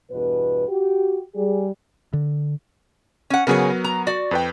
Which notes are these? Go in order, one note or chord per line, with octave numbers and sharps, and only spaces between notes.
E2 G2 B2 B4
F#4 G4
G3 G#4
D3
C#4 F#5
C#3 F#3 B3 G#4 A#4 C#5
A#5
F#4 D5
F2 B4 G5